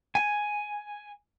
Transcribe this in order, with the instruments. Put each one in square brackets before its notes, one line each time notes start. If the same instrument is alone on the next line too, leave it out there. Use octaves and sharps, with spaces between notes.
[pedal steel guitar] G#5